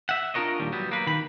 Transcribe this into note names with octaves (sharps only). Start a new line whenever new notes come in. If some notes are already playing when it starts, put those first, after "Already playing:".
E5 F#5
D4 F4 F#4 A#4 C#5 D#5
D#2 A#2 G3
F#3 G3 B3
A#3 B4
D#3 B5